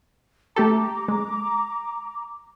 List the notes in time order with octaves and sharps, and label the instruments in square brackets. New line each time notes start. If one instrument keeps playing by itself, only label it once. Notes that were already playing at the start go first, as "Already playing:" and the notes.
[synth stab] A3 G4 A4 [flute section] A#5 D6
[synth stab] G#3